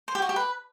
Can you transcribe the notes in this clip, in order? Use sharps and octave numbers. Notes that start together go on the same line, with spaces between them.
C5
G4
F#4
G4
B4